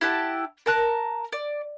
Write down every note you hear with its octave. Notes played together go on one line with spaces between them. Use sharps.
E4 G4 F#5 A5
A#4 A5 F#6
D5